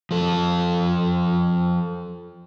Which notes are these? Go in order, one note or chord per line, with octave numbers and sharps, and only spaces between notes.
F3 A4